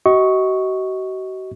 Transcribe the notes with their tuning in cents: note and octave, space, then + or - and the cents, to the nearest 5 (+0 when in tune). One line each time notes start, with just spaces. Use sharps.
F#4 +40 D#5 +25 C#6 +0